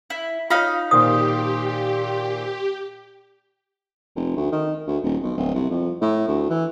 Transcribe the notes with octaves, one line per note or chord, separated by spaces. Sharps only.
E4
D#4 F4 C#5 F5 B5
A#2 D#3 G4 C5 D#6
F1
D2
D#3
D2
D#1
B1
D1
C2
F2
A2
D2
E3